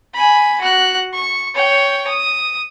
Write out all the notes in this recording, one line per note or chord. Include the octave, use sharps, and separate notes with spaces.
G#5 B5
F#4 F#6
C#6
C#5 G5
D#6